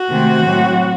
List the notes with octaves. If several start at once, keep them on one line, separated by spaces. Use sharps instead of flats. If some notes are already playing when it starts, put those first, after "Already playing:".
Already playing: F#4
C3 D#3 A3 C4
A2 F#3 A3 C4